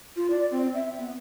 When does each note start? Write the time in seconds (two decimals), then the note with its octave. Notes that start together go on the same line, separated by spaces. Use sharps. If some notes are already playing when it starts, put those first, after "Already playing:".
0.16 F4
0.31 D5
0.51 C4
0.74 E5
0.98 B3